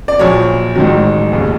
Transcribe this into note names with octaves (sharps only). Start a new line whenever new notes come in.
D5
A#1 A#2 F#3 C#5
A1 G#2 D#3 F#3
F1 D#2 C#3